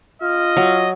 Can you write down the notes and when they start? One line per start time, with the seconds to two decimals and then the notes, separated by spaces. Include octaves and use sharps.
0.22 F4 D#5 F6
0.57 F#3